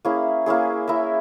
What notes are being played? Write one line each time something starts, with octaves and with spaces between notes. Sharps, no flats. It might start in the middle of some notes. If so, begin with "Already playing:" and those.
A#3 C#4 E4 G#4
A#3 C#4 E4 G#4
E4 A#4 E5